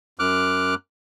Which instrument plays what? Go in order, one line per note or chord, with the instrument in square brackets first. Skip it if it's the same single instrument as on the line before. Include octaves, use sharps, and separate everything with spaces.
[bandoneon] F#2 D6 F6 F#6